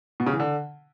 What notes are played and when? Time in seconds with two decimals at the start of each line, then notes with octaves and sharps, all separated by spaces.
0.20 B2
0.26 C#3
0.33 E3
0.40 D3